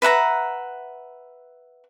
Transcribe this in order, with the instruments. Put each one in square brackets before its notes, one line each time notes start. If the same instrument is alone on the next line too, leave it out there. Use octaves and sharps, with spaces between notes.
[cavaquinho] B4 E5 F#5 A#5